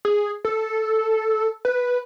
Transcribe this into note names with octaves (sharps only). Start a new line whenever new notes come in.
G#4
A4
B4